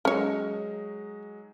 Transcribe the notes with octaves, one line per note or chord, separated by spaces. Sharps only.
F#3 G#3 C#4 D#4 C#5